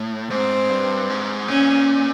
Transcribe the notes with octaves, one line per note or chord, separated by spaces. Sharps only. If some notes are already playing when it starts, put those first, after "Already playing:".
Already playing: A2
G#2 C4
G2
G#2
A#2 C#4